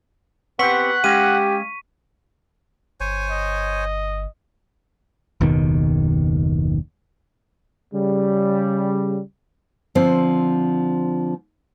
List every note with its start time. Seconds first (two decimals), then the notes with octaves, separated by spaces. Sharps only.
0.59 B3 C4 G4 F#5 C#6 B6
1.04 G#3 C#4 G4 F5 D#7
3.00 G1 C5 C#5 G#5
3.30 D#5
5.41 F#1 D#2 B2 D#3
7.92 C#3 G3
9.95 D3 F3 C4